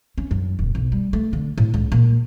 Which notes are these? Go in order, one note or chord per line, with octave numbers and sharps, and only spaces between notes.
C#4
F#2
D#1
B1
G3
A3
D3
A2
C#2
A#2